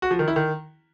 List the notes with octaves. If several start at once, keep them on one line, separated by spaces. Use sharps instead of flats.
F#4
F3
D#3
E4
D#3